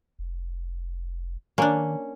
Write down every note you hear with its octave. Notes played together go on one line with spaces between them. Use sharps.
F1
D#3 A#3 C#4 D4